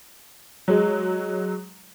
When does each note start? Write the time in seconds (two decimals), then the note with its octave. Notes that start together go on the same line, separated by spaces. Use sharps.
0.68 F#3 G#3